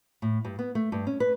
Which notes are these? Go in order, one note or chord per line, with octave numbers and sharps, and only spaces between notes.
A2
G2
B3
A3
G2
C#4
B4